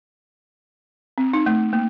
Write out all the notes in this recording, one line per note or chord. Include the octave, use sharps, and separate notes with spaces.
C4
D#4
A3
A#3